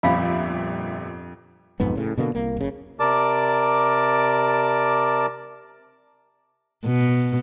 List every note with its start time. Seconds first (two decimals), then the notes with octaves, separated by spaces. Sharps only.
0.03 G1 F2 A#2 E5 F5 B5
1.80 B1 F2 G#2 B3
1.95 A2 C#3
2.18 B2 D3 A3 A#3
2.35 C2 A#3
2.57 F#1 C#3
3.00 C3 A#4 D5 A5 D6
6.85 B2